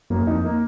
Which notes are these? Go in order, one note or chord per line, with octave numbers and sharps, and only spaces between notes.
F#2 A#3
F2 D#4
A#3